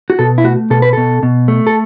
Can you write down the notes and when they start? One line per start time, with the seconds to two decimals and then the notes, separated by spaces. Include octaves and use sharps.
0.10 F#4
0.19 B2 A4
0.38 E4
0.44 A3 F#4
0.70 B2 A4
0.82 B4
0.93 B2 A4
1.23 B2
1.48 A3
1.67 A4